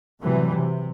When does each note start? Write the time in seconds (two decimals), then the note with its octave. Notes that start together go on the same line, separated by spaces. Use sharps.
0.20 A2 C3 E3 F#3 G3
0.55 C3